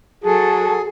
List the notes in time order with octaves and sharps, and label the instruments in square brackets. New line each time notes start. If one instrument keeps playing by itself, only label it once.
[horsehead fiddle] F#3 A4 [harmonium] G#4